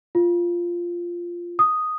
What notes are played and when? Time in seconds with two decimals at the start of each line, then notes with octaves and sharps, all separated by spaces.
0.15 F4
1.59 D#6